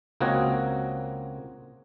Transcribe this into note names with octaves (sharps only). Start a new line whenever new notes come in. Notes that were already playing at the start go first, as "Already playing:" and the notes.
C#2 A#3 C4 F#4 C#5 D#5